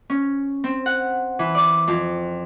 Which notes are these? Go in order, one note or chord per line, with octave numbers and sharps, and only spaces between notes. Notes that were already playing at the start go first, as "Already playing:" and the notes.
C#4
C4
F#5
E3
D5
F2